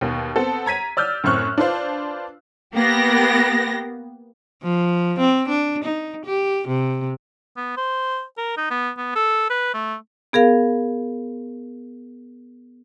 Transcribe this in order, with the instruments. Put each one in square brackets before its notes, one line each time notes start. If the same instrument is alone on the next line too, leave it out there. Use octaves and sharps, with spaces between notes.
[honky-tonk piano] D#2 B2
B3 C4 A4
A#5 G#6 B6 D#7
D5 E6 F6 G6
F#2 A2 C4 C#6 F6 F#6
D4 F4 B4 C5 F5
[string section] A#3 B3 G4 A#6
[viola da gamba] F3
C4
D4
D#4
G4
C3
[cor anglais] B3
C5
A#4
D#4
B3
B3
A4
B4
A3
[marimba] B3 G#4 A#4 F5